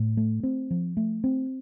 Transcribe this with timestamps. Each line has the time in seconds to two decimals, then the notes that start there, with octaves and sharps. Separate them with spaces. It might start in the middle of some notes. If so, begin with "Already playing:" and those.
Already playing: A2
0.17 A3
0.43 C4
0.71 F3
0.97 A3
1.24 C4